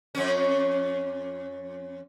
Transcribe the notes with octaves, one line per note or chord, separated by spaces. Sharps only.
F2 C#4